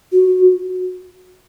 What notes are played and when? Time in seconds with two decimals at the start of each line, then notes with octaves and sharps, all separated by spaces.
0.12 F#4